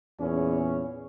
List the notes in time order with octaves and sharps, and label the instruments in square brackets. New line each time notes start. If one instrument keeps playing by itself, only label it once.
[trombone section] E2 A#2 C#4 G#4